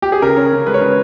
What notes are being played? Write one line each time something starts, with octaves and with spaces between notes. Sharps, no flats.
G4
G#4
C#3 A#4
C#4
C#3
G#3 B4
C#5
C#3 B4